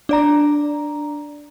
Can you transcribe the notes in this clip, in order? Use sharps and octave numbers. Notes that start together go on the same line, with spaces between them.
D4 D5 A#5